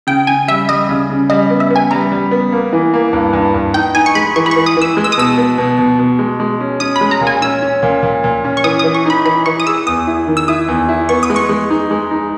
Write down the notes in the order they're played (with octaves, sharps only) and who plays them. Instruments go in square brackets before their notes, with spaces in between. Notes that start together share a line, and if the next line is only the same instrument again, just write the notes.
[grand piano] C#3 [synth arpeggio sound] G5
[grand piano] C#3 [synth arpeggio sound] G#5
[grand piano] G3 [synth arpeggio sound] E5
[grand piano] G3 [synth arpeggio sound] D#5
[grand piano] C#3
C#3
[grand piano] G3 [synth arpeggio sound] D#5
[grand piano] B3
[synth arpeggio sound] E5
[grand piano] B3
[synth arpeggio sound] G#5
[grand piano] G3 [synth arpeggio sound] A#5
[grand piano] G3
B3
A#3
E3
A#3
G2
G2
G2
[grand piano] D#4 [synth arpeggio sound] G5
[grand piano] D#4 [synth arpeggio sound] G#5
[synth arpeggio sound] C#6
[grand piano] G#3 [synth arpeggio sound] B5
[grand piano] E3 [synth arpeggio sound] C#6
[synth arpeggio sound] B5
[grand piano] E3 [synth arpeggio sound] C#6
[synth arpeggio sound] D#6
[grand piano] E3 [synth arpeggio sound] E6
[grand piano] G#3
[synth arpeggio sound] E6
D#6
[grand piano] B2 [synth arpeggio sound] E6
[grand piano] B3
B2
B2
B2
G#3
G#3
C#4
[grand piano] C#4 [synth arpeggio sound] D#6
[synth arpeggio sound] B5
[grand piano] G#3
[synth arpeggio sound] A#5
[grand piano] A#2
[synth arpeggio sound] G#5
[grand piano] C#4 [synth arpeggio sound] E6
[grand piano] C#4
A#2
A#2
A#2
C#4
[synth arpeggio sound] C#6
[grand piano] E3 [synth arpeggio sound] D#6
[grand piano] E3 [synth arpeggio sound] D#6
[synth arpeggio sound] C#6
[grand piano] D#4 [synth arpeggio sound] B5
[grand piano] E3 [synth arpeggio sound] B5
[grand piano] E3 [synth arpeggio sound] C#6
[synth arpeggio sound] D#6
[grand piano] G#4 [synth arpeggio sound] E6
[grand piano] E2 [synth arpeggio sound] D#6
[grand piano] E4
D#3
[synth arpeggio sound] E6
[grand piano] E4 [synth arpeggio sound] D#6
[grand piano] E2
E4
[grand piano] B3 [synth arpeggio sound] C#6
[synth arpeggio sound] D#6
[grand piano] G#3
[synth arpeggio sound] C#6
[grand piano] G#3
D#4
G#3
D#4